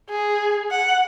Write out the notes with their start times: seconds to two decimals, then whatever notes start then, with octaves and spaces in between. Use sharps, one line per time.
0.10 G#4
0.71 F#5